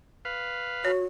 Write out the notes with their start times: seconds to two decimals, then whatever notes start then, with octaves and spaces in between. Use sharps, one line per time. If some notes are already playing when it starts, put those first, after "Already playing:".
0.25 B4 F5
0.85 F#4 C#5